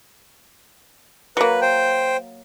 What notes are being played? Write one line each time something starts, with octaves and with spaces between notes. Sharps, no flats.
F#3 A#3 B4
C5 G5